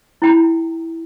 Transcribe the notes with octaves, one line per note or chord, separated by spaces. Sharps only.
E4 G5 A#5